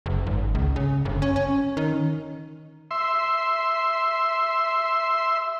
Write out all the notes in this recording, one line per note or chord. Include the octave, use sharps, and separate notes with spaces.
F#1
G#1
C#2
C#3
G1
C#4
C#4
D#3
E5 C6